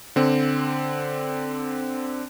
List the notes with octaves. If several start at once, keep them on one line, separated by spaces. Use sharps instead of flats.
D3 C4